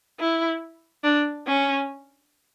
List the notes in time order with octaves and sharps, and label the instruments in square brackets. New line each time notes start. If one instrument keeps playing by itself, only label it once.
[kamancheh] E4
D4
C#4